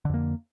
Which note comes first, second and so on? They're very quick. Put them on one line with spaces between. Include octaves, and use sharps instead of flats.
D3 F2 A#3